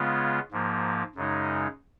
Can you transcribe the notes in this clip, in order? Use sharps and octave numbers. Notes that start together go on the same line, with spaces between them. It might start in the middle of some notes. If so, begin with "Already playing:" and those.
Already playing: C#3 G#3 B3 F4
G#2 F3 A#3
F#2 C#3 G#3 D#4